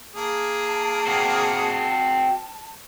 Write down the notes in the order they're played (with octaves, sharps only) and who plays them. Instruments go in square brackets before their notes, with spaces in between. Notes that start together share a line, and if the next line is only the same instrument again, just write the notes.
[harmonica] A#3 G#4 [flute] A5
[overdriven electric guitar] C4 F#4